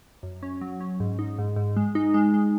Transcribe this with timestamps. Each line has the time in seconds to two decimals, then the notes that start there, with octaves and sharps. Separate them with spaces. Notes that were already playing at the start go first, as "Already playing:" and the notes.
0.23 F#2
0.43 C#4
0.61 F#3
0.80 C#4
1.00 G#2
1.19 D#4
1.38 G#2
1.56 G#2
1.76 G#3
1.95 D#4
2.14 G#3
2.34 G#3